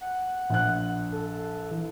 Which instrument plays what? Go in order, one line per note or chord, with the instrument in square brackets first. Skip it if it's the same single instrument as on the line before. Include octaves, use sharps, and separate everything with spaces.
[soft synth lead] F#5
[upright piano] A#1 F#6
[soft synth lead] A4
E3